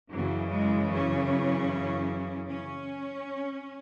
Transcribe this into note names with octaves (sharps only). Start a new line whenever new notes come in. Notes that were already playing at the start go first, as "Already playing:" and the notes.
F#2 C#3 E3 F#3
G#3
C#4
C#4